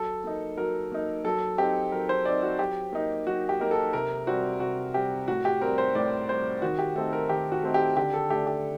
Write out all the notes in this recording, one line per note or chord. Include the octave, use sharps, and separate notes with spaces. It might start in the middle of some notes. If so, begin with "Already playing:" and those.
Already playing: F#3 A4
A#3 D#4
F#3 A#4
A#3 D#4
F#3 A4
C4 D#4 G4
F#3 A#4
C5
C4 D#4 D5
F#4
F#3 G4
A#3 D#4
F#3 F#4
G4
A#3 D#4 A#4
A4
C3 A#4
G3 C4 F#4
C3 F#4
G3 C4 G4
A2 F#4
G4
G3 C4 A#4
C5
A2 D5
G3 C4 C5
D#3 F#4
G4
A3 C4 D#4 A4
A#4
D#3 G4
F#4
A3 C4 D#4
G4
D3 G4
A4
A3 D4 G4
G4